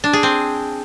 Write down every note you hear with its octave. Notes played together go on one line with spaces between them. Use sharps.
D4
G#4
C4